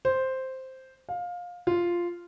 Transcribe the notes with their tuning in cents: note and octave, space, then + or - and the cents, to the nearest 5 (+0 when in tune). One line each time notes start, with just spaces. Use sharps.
C5 +0
F5 +20
F4 -5